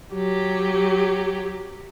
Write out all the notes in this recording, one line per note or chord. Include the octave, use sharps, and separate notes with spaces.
F#3 G4